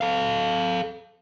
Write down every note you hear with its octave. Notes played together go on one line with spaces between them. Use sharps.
A4 F5